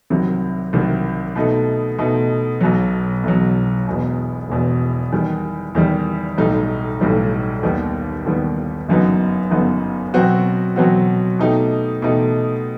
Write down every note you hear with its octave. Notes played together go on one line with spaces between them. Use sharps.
C2 C3 D#3 F#3
C2 C3 D#3 F#3
B2 A3 D#4
B2 A3 D#4
B1 B2 F#3
B1 B2 F#3
E1 E2 B2
E1 E2 B2
E2 D#3 G3
E2 D#3 G3
B1 A2 G3 D#4
B1 A2 G3 D#4
D#2 D#3 G3 B3
D#2 D#3 G3 B3
G1 F#2 F#3 B3 D#4
G1 F#2 F#3 B3 D#4
B2 F#3 C4 F#4
B2 F#3 C4 F#4
B2 A3 D#4 G4
B2 A3 D#4 G4